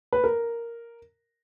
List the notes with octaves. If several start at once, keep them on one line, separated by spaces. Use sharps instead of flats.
B4
A#4